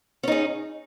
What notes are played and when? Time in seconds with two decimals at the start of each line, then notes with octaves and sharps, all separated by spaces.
0.23 C#4
0.28 D#4
0.32 G#4